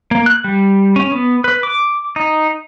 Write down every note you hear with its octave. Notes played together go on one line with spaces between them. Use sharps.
A#3
F#6
G3
C#4
B3
B4
D6
D#4